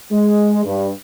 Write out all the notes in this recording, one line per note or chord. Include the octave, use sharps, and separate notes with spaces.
G#3
G2